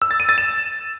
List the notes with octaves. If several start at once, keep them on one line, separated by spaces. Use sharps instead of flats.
E6
A6
D#7
A6
E7